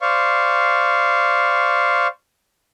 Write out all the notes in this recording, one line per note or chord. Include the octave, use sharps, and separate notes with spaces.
C5 D5 F5 C#6